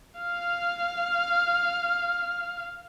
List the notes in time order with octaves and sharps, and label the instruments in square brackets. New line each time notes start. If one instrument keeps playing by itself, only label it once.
[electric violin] F5 F6